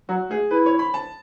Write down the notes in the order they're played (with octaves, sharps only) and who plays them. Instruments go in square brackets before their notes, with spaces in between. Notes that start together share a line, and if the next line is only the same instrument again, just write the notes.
[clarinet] F#3 [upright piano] F#4
[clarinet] A3 [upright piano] G#4
[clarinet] E4 [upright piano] B4
[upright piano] C#5
B5
A5